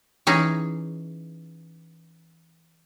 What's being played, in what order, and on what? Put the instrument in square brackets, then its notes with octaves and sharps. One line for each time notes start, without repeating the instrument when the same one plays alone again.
[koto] E3 C#4 D#4 G#4